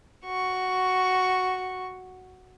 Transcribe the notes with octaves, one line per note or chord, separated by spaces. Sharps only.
F#4 C#6